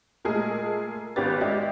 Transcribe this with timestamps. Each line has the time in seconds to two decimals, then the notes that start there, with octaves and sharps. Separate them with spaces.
0.25 A#2 G#3 A3 G#4 A#4
1.16 G#1 B3 C#4 G4 B4 A6
1.41 G#3 G4 D5 E5